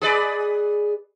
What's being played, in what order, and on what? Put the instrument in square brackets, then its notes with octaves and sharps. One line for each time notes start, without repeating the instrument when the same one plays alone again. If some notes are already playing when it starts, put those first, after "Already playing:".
[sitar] G#4 B4 D5